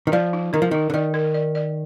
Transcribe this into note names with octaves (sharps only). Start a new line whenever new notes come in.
D#3
F3 D5
D#4
D#3 A#4
F3
D#3 D#4
D3
D#3 D5
A#4
D5
D5